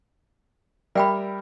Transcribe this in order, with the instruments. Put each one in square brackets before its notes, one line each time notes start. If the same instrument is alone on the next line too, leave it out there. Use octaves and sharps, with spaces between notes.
[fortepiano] G3 A#4 E5 [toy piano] D5 G5 B5